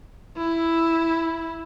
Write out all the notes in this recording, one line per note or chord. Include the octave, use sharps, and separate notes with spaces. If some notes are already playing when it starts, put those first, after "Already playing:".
E4